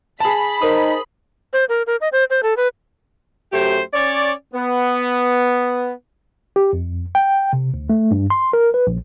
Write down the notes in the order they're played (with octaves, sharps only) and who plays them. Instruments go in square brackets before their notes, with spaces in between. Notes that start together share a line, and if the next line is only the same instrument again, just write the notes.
[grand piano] G#4 A5 [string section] B5 B6
[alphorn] D#4 [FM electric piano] A#4 C5 D#6
[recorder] C5
A#4
A#4
D#5
C5
C5
A4
B4
[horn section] F#2 A3 G4 C5
C#4 C#5 D5
B3
[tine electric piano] G4
F2
G5
C3
D2
A3
G2
C6
A#4
B4
A#1